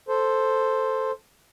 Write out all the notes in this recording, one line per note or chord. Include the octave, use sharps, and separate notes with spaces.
A4 C5